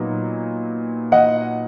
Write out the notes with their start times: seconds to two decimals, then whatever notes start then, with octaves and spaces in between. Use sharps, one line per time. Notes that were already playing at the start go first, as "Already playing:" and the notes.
Already playing: A#2 F#3 B3 D#4
1.12 D#5 F#5